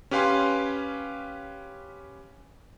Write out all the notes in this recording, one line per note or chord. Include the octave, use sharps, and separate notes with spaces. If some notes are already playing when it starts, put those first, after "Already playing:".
C#4 G4 B4 F5 G#5 C6